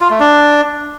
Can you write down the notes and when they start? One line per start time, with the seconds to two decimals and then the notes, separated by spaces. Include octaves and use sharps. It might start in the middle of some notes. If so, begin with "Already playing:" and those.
0.01 F4
0.10 A3
0.20 D4